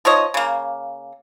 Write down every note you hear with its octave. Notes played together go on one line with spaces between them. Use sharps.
F3 D#4 C#5 D#5
C#3 A#3